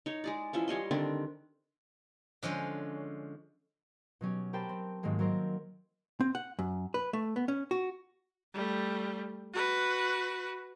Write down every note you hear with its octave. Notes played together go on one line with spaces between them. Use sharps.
D#4 C#5
G#3 G#4 D5
E3 F3 C#4 E5
G3 C#5 D#5 C6
D3 D#3 C4 D4
D3 F3 G#3 C#4
B2 F#3 C#4 G4
G4 A#4 C5 G5 A5 B5
C4
G#2 D#3 F#3 G#3 A#3
F#3 C4 A#4 C5
C4
F#5
F#2
B4
A3
B3
C#4
F#4
G3 A3
F#4 B4